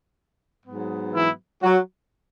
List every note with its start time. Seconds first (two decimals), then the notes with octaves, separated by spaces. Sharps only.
0.66 G#2 F#3 B3
1.14 E3 E4
1.63 F#3 F#4